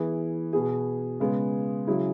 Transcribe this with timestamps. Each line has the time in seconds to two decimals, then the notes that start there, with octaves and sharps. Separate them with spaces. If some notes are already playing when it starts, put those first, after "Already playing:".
Already playing: E3 B3 E4 G#4
0.53 B2 B3 G#4
1.20 C#3 G#3 B3
1.87 C#3 F#3 E4 G#4